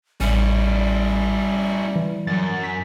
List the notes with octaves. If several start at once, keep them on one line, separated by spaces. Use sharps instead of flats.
A1 G3 C#4 E4
E3
F#2 A6
B6